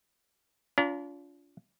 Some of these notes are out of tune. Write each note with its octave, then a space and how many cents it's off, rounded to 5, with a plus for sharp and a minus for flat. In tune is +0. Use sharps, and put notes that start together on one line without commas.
D4 -45 F4 +0 A#5 +0